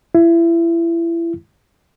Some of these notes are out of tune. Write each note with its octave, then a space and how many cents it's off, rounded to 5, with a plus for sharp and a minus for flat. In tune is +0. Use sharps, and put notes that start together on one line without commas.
E4 +30